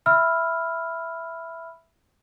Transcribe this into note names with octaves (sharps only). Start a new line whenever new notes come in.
E5 B5 E6 F6